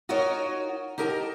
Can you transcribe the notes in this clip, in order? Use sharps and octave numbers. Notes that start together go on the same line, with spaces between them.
D#4 F4 F#4 A#4 C#5 D#5
D#4 G4 A#4 D#5 G#5 A5